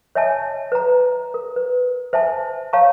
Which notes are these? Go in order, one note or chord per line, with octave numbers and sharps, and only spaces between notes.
C#5 D#5 E5 G#5 A5
B4 A#5
A#4
B4
C5 E5 G#5 A5
C#5 F5 A5 A#5 C#6